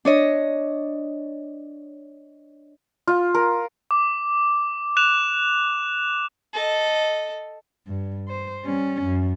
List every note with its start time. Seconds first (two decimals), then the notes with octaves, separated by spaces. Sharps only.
0.05 D4 C#5 D#5
3.07 F4
3.35 A#4
3.91 D6
4.97 F#6 E7 F7
6.53 A4 D#5
7.88 G2
8.28 C5
8.64 G3 C#4
9.03 F#2